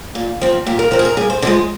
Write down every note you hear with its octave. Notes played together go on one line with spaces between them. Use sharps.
A#2
F3 C4
A#2 G4
A#4
F3 C4 A#4
G#4
A#4
G2 G#4
C5
D3 F3 G#3 G#4